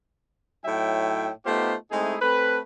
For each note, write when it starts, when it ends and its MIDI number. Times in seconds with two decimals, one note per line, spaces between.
0.64 1.29 45
0.64 1.29 54
0.64 1.29 63
0.64 1.29 76
0.64 1.29 79
1.45 1.74 57
1.45 1.74 59
1.45 1.74 63
1.45 1.74 65
1.45 1.74 67
1.45 1.74 72
1.90 2.15 56
1.90 2.15 57
1.90 2.15 60
1.90 2.15 63
1.90 2.15 64
1.90 2.15 68
2.21 2.59 57
2.21 2.59 60
2.21 2.59 69
2.21 2.59 71